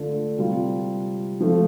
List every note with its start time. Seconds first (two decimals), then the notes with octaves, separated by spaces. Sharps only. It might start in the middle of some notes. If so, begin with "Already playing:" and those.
Already playing: D3 A3 D4 F4
0.38 C3 G3 F4
1.40 F3 A3 F4